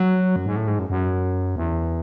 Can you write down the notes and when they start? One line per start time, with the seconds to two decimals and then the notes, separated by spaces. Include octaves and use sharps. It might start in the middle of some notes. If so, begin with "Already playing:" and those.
Already playing: F#3
0.36 F#2
0.46 G#2
0.56 A2
0.68 G#2
0.79 F#2
0.90 F#2
1.56 E2